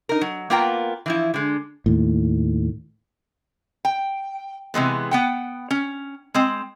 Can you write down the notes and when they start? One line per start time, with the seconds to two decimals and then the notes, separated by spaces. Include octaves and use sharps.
0.09 D#4 A#4
0.21 F#3
0.50 A#3 B3 F4 A#4 G5 A#5
1.06 E3 F3 E4
1.34 D3 G#3
1.86 D#2 A2
3.85 G5
4.74 C3 E3 G#3 B3
5.11 B3 F#5 G5
5.71 C#4
6.34 G#3 C4